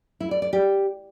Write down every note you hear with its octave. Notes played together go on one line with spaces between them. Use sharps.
E4
D5
D5
G4